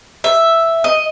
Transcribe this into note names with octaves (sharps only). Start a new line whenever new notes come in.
E5
D#5